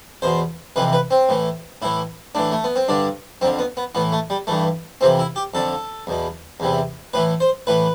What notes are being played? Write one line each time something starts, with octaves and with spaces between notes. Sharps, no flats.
E2 B2 C5
F2 C3 E3 B4
B4
C4
A2 E3
A2 E3 E4
A2 E3 D4
A3
B3
C4
G2 D3 D4
F2 D3 C4
B3
B3
A2 E3 B3
A3
G3
G2 E3 A3
F2 C3 E3 C4
E4
G4
F2 D3 A4
E2 B2
E2 C3 E3
A2 E3 B4
C5
A2 E3 B4